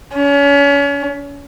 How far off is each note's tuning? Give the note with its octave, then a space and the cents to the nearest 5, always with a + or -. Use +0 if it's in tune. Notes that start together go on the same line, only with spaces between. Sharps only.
C#4 +35